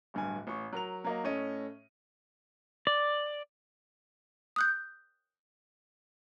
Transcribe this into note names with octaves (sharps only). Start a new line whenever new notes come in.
D1 G2 G#5
A1 C#6
F#3 A#4 F7
F#3 A#3 D#5
A2 A3 C#4 D#5 D#7
D5
D#6 F#6 G6